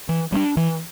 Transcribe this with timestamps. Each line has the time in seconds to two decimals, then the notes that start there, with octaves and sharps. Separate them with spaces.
0.09 E3
0.32 G3 B3 D4
0.57 E3